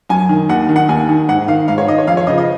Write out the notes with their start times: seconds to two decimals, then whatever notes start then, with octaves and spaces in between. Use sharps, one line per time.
0.09 F#2 G#5
0.29 D#3
0.49 D#2 F#5
0.69 D#3
0.76 F#5
0.89 D#2 G#5
1.09 D#3
1.28 G#2 F#5
1.48 D#3 F5
1.68 G#2 F5
1.78 C#5
1.87 D#3 D#5
1.98 C#5
2.07 F2 F5
2.17 C#5
2.27 C#3 F3 D#5
2.38 D#5